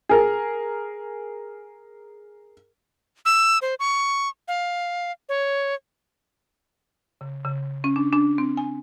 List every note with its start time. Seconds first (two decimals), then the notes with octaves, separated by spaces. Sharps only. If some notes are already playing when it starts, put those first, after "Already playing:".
0.09 G#4 A#4
3.25 E6
3.62 C5
3.80 C#6
4.48 F5
5.29 C#5
7.21 C#3
7.45 C#3
7.84 C#4
7.96 D4
8.13 D4
8.38 C4
8.57 G#5